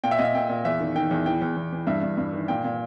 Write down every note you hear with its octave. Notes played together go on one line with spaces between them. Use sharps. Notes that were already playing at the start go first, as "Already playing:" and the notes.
A#2 G5
E5
A#2 D#5
E5
A#2 G5
A#2
E2 E5
D#3
D#3 G5
E2
E3 G5
E2
E2
E3
G2 E5
G2
G2
D#3
A#2 G5
A#2